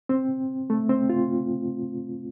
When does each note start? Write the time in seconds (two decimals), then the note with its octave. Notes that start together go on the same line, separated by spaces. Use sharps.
0.09 C4
0.70 A3
0.89 C4
1.10 F4